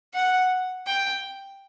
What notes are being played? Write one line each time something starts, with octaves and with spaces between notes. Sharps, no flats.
F#5
G5